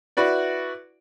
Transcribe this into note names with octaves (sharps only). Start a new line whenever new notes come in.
E4 F#4 B4 D5